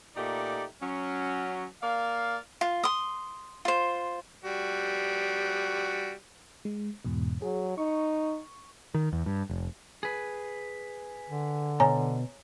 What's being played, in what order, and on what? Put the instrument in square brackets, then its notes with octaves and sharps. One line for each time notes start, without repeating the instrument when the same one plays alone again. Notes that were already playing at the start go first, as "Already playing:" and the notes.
[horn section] A#2 A3 D#4 G4 D5
F#3 C#4
A#3 D5 F5
[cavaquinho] F4
C6 D#6
F4 C5
[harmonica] G3 F#4
[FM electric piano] G#3
E2 G#2 B2
[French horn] F#3 [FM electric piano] G#4
[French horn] D#4 [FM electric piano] C#6
[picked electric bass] D#3
E2
G2
F1
[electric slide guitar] G#4 B4
[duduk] D3
[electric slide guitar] B2 [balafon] C#5 G#5 A#5